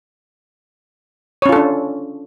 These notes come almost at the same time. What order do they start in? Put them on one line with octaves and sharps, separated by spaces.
C#5 C#4 F4 A4 D4